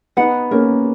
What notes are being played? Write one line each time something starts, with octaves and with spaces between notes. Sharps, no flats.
B3 D#4 F#5
A#3 C#4 A#4